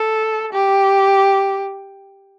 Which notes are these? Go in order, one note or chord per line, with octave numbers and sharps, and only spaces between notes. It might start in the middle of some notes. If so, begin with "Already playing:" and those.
Already playing: A4
G4